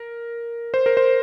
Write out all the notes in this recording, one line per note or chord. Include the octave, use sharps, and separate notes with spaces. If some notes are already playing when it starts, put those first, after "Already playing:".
Already playing: A#4
C5
A#4
C5